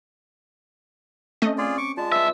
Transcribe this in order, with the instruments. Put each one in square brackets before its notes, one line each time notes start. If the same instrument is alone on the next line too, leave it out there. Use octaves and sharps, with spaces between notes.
[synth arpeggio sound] A3 D#5 [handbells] C4 C#4
[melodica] F4 G#4 D5
C#6 D6
[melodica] G#3 A5 [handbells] F4 D5
[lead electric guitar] C2 E5 [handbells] B4